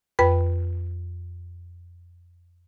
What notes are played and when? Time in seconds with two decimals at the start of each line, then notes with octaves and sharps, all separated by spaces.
0.19 F2 B4 G5 B5